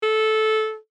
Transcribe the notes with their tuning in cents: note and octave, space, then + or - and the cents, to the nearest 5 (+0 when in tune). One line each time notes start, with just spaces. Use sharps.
A4 -15